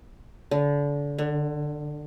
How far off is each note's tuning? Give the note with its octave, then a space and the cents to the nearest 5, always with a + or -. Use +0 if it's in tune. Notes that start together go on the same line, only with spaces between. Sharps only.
D3 -30
D3 +20